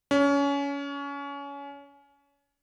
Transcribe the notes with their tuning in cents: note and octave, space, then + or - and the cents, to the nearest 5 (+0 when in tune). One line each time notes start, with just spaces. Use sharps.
C#4 +25